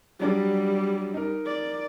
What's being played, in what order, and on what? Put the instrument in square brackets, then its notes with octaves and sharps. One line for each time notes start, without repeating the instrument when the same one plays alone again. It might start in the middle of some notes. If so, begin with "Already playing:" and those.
[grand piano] F#3 D4 D6 [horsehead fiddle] G3
[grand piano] D#4 A#4
[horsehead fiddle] D5